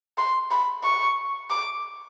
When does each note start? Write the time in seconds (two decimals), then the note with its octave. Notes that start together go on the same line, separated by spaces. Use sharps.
0.18 C6
0.51 B5
0.84 C#6
1.50 D6